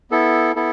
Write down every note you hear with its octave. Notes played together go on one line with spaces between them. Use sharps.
B3 E4 A4
B3 E4 A4